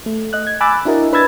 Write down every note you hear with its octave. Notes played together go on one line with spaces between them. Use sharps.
A3
D#5 F#6
G#6
G#5 B5 D6 E6 F#6 A6
D4 E4 F#4 A#4 D#5
D4 B4 B5 E6 G#6 A6